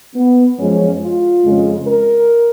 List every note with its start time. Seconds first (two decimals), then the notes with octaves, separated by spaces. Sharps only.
0.15 B3
0.58 F#2 F3 G#3 C#4
1.02 F4
1.44 F2 C#3 G#3
1.87 A#4